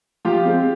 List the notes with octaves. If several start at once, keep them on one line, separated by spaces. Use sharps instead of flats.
F3 F4 G4
G#3 C4